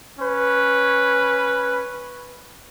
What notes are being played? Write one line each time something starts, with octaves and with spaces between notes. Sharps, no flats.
C#4 B4